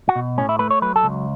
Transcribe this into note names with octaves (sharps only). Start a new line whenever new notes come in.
F#4
B2
A2 C#4
E4
A3 B4
C#5
F#3 B4
A4
C#2